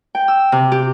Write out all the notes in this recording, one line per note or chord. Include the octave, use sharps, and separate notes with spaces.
G5
E6
C3
G4